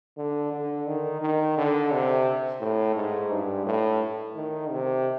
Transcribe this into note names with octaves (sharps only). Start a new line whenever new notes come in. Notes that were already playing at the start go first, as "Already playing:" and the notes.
D3
D3
D#3
D#3
D3
C3
A2
G#2
G2
A2
D#3
C3